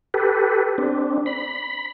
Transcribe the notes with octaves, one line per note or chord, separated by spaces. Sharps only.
G4 A4 B4
C4 D4
B5